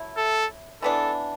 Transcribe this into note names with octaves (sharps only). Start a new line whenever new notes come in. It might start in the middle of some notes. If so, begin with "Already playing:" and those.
Already playing: F#3 A3 E4
A4
E3 B3 D4 A4